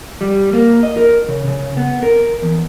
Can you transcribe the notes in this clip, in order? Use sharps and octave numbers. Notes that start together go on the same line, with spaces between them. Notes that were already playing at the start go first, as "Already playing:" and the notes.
G3
A#3
D#5
A#4
C#3
C#3
B3
A#4
E2